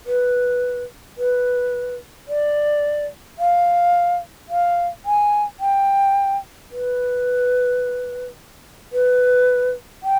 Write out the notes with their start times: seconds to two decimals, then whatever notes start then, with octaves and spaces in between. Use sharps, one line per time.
0.06 B4
1.18 B4
2.28 D5
3.39 F5
4.49 F5
5.05 G#5
5.60 G5
6.71 B4
8.93 B4
10.03 G5